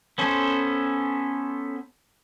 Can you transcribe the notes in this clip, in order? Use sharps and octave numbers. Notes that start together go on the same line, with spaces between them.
B3 C#4 A4 C5